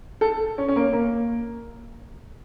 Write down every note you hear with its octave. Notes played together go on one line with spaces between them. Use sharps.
A4
C#4
C#4
A#3
A#3